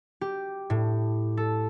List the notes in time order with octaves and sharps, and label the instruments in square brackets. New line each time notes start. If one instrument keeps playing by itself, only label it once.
[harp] G4
A2
A4